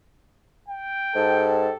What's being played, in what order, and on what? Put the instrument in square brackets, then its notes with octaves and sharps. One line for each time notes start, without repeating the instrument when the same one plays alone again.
[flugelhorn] G5
[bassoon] G#2 [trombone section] G4 A4